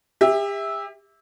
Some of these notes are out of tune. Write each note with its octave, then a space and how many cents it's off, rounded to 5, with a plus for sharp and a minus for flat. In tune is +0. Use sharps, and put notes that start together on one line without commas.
G4 +40 E5 -10